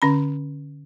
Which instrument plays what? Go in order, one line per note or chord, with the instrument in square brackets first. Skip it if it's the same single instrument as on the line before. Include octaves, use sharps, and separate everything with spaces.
[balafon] D3 C#4 B5